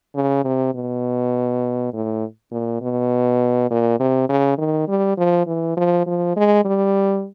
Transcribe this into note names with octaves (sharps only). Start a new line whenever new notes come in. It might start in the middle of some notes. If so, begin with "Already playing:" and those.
C#3
C3
B2
A2
A#2
B2
A#2
C3
C#3
D#3
G3
F3
E3
F3
F3
G#3
G3